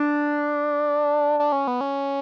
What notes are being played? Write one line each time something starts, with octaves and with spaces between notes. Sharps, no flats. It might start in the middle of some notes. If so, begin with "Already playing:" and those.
Already playing: D4
D4
C#4
B3
C#4